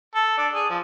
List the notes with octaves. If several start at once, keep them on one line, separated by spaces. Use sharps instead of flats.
A4
D4
G#4
F3